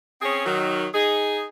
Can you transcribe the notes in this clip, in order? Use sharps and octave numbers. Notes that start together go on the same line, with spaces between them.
C4 C#4 G#4
D#3 F#3
D#4 G#4